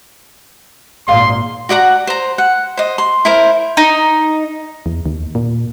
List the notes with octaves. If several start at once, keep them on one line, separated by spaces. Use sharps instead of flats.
G#1 A#2 D5 D#5 F5 C6
F#4 D5 F#5 A#5
C5 A#5
F#5
C5 D#5
C6
E4 A#4 C5
D#4
E2
D#2
A#2